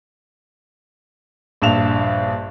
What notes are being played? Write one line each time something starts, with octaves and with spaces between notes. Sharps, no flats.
A#1 G2 E7 F7